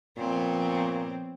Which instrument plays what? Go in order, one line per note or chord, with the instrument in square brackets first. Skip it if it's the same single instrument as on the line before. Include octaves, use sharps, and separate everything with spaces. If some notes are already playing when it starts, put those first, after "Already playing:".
[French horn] A#2 [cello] F3 C4 [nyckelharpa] B3 C#5